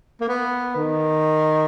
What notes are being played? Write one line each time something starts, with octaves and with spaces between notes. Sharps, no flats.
A#3
B3
D#3